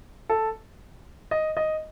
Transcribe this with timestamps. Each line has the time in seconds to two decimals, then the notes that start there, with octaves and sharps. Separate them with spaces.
0.30 A4
1.31 D#5
1.57 D#5